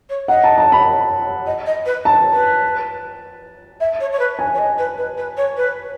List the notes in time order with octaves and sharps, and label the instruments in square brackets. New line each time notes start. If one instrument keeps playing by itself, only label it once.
[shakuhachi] C#5
[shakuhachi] D#5 [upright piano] F#5
[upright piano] A5
A5
B5
[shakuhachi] D#5
D#5
B4
[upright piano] A5
[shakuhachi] B4
E5
C#5
C#5
B4
[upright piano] G#5
[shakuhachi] C#5
D#5
B4
B4
B4
C#5
B4